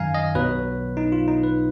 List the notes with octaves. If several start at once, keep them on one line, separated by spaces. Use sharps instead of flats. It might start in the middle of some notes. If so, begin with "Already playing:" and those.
Already playing: F#2 D#3 F#3 F5 G#5 A#5
D#5
B1 B2 F#3 B4
D#4
F4
D#4
B4